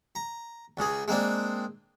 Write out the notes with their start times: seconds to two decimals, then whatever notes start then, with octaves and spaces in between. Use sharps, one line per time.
0.15 A#5
0.77 C#2 C#3 G#4
1.08 G#3 A#3 C4 D4